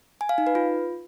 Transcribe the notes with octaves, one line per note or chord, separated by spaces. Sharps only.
G#5
F5
D#4
B4
F4